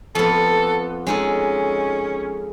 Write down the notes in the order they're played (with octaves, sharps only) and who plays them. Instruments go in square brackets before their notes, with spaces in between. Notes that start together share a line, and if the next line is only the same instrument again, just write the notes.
[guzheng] F2 B3 [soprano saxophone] A4
[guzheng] G#3 D#4 A4 [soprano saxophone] C#4